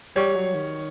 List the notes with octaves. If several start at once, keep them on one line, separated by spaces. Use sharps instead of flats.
G3 C#5
F#3
D#3